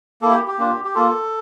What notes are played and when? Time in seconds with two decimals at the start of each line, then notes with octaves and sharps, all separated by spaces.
0.22 A#3 E4 A4
0.31 G4
0.48 G4
0.58 A#3 D4 F4
0.85 G4
0.95 A#3 F4 A4